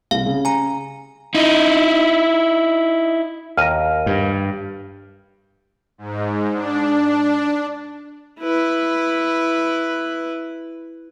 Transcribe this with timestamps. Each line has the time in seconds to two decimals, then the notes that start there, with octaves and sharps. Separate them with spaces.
0.11 C2 C3 F5
0.26 C#3
0.45 G#5 A#5
1.35 D#4 E4
3.57 D#2 A#4 F6 D#7
4.06 G2
5.98 G#2
6.53 D4
8.40 E4 B4